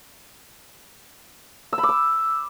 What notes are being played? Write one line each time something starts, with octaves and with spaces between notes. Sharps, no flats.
E6
B5
D6
E6